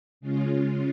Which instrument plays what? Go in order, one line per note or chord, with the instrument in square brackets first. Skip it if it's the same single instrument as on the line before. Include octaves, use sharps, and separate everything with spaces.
[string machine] C#3 G#3 C#4 F4